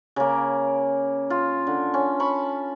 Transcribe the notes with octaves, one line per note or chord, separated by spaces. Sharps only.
C#3 A#3
F4
D3
C#4
A5 B5 C#6